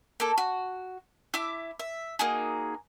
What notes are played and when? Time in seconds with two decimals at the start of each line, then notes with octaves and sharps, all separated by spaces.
0.20 A#3 A4
0.38 F#4
1.34 E4 E5 D6
1.79 E5
2.19 A#3 D#4 F#4 G#4